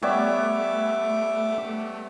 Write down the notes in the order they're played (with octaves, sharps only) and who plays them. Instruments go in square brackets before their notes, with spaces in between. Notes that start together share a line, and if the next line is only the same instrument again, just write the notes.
[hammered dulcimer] G3 B3 C#5 [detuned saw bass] A3 [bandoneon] E5 D6